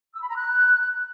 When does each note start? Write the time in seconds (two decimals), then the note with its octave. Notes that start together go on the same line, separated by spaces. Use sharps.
0.14 E6
0.21 B5
0.29 A#5
0.36 F#6